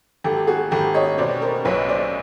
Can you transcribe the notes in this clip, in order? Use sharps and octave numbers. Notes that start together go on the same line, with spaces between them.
G#1 G4 A4
F#4 G#4
G#1 G4 A4
C#5 D#5
B2 C5 D5
A#4 C5
B1 B4 C#5
C5 D5